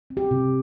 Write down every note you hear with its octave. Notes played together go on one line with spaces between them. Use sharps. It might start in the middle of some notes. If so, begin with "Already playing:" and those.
C4
G4
C3